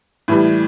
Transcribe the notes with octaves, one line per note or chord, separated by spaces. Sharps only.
A2 E3 G3